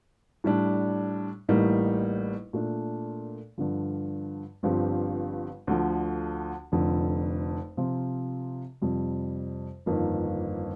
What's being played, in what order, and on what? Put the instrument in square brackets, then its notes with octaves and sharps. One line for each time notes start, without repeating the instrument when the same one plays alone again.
[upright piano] A2 G3 D4
A1 A2 G3 A#3 D#4
A#2 A3 D4
G2 D3 F3
G1 G2 F3 C4 G4
D2 D3 F3
F1 F2 D3
C3 F3 C4 F4
F2 C3 G3
G1 F2 D#3 A#3